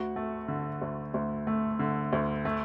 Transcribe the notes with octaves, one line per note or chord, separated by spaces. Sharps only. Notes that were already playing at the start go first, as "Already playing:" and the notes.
Already playing: D2 F#4
A3
D3
D2
D2
A3
D3
D2
A3